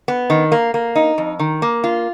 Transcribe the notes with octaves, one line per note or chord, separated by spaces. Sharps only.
B3
D#3
A#3
A#3
D#4
F2
D#3
A#3
F4